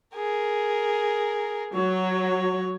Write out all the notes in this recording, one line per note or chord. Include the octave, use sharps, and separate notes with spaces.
G#4 A#4
F#3 C#5